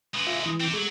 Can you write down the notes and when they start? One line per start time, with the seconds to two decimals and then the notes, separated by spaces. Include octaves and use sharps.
0.14 G#3 B4
0.27 F4 E5
0.46 E3
0.60 C4 G4
0.73 F#3 G#3